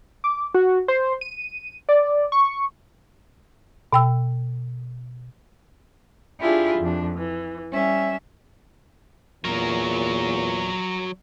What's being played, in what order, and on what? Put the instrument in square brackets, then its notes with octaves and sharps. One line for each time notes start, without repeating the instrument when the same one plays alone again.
[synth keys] D6
F#4
C5
D#7
D5
C#6
[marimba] B2 G5 E6
[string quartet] D4 E4 F4 G4 G#4
F2 D4
E3
G3 C#4 E5
[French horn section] E2 A#2 [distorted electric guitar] F#3 A#4